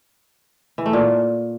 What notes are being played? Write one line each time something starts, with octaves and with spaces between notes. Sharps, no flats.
E3
A3
A#2